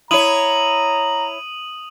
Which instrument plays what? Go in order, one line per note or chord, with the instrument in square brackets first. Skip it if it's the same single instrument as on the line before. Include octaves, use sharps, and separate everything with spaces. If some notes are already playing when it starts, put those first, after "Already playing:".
[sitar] E4 C#5 [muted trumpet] A#5 [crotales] D#6 D#7 F#7